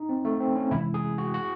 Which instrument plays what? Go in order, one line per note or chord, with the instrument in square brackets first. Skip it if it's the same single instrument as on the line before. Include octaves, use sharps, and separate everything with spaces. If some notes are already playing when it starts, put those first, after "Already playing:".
Already playing: [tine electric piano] D#4
C4
A3
C4
C#4
[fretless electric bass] C3 E3 G#3 C#4 [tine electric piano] E4
[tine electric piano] G#4
F#4
F#4